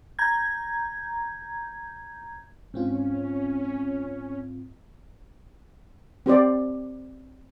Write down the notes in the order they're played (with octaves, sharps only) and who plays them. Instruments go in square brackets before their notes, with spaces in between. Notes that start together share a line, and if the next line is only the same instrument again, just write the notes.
[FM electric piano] A#5 G6 G#6
[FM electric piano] G#2 C4 F4 [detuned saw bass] C#4
[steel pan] C4 G4 C5 D5